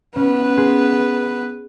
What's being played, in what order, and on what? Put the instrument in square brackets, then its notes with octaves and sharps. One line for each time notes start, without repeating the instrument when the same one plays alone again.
[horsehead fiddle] B3 B4 [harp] C#4
[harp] G#4 C6 F#6